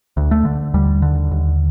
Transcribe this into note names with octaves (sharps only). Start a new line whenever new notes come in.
D2
A3
D3
D#2 G3
D3
D#2